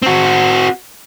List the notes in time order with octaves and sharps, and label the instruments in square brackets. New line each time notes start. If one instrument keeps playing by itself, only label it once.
[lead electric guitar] C4 F#4